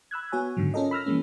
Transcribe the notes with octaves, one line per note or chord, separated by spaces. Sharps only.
B5 E6 F#6 G#6
B3 F#4 C#5 G#5
G#2 D3 D#3 F#3
C#4 F4 A4 A#4 D#5
B5 E6 F6 A#6
E3 F3 G#3 A#3 C#4